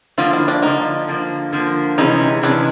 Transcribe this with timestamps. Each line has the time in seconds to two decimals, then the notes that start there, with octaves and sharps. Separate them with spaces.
0.18 D3 F3 A#3 F4
0.33 E4
0.48 D4
0.63 D3 F3 A#3 D#4
1.08 D3 F3 A#3
1.53 D3 F3 A#3
1.98 C3 E3 G#3 C#4 D#4
2.43 C3 E3 G#3 C#4 D4